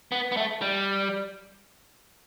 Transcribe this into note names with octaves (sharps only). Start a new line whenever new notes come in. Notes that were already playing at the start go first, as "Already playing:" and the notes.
B3
B3
A3
G3